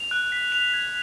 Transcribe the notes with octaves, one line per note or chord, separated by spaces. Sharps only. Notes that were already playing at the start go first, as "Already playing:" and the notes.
Already playing: F7
F#6
B6
F7
G#6